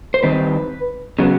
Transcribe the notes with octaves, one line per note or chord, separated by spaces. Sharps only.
C5
D#3 G3 C4 B4
C#3 F#3 B3